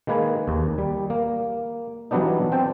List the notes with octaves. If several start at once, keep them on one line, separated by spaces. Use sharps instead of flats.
D#3 G#3 A#3 B4 G#5
D#2
G3
A#3
E3 F#3 G3 B3 D4 D#4
C4 C5 G5 A5